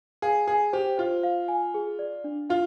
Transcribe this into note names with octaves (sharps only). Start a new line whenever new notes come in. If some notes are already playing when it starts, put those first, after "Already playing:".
G#4 F5
G#4 G#5
G4 C5
F4 C5
F5
G#5
G#4
D5
D4
F4 F5